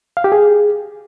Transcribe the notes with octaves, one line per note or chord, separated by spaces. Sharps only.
F5
G4
G#4